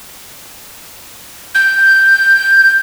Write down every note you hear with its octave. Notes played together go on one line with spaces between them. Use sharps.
G6